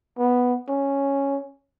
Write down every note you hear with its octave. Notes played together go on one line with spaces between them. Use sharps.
B3
C#4